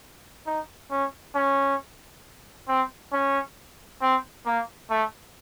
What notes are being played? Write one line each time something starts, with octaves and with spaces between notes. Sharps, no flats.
D#4
C#4
C#4
C4
C#4
C4
A#3
A3